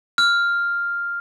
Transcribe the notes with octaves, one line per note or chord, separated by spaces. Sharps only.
F6